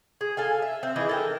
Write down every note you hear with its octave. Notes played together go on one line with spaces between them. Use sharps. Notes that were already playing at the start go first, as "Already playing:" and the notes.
G#4
A4 F5 G#5
E5
C4
E3 D#4 E4 G#4
A4 A#4 G5